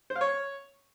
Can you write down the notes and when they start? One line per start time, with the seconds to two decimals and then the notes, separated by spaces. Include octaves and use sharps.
0.10 C5
0.16 F5
0.21 C#5